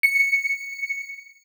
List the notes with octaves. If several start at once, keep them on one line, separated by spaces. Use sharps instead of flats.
C#7